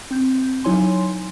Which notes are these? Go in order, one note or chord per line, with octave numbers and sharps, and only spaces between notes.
C4 G6
F#3 D#4 E4 C#5 G#5 C6